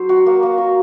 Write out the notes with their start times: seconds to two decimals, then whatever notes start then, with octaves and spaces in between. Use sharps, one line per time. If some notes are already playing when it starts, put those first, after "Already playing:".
Already playing: F#3 C5
0.09 F#4
0.26 A#3
0.43 A#3
0.58 F#4